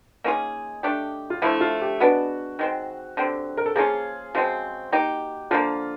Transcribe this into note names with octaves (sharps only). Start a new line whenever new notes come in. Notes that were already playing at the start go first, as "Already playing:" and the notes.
A#3 C#4 D#4 F4 G#4
A3 D4 G4
F4
D3 F3 A3 E4
F4
G4
G#3 B3 D4 F#4
D#3 G#3 C4
D3 G3 C4
A#4
A4
F3 A#3 C#4 F4 G#4
C#3 F3 G#3 C4 F#4
A#3 D#4 G4
D3 F3 A#3 F4